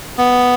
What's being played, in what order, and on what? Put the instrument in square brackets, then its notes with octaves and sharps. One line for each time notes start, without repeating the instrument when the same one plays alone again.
[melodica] B3